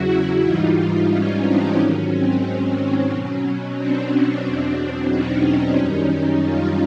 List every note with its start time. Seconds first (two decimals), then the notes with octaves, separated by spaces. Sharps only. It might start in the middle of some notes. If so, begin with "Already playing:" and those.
Already playing: E2 C#3 F#3 E4 F#4
0.43 G#2 E3 G3 D#4 F4
1.10 C#4 D#4
1.43 C4 D4
1.76 G#2 D#3 F#3 C#4
2.10 C4
2.43 C#4
3.09 B2 F#3 C#4
3.76 C4 D4
4.43 E2 B2 F#3
5.09 C#4 D#4
5.77 F#2 D#3 G3
6.43 D#4 F4